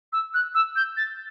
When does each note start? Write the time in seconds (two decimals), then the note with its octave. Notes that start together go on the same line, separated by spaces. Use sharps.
0.13 E6
0.34 F#6
0.55 E6
0.76 G6
0.97 A6